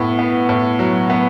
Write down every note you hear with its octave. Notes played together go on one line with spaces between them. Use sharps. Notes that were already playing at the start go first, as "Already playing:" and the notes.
Already playing: A2 B3
B3
A2
F#3
B3